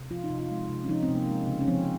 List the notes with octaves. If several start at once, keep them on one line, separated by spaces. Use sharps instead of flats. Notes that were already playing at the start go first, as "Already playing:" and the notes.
Already playing: C3
F3 F4
D#4
C3
F4
G#3
C3
C#4
F3 D#4
C4
C3
A#3
G#3
C#3
C#4
F3 C4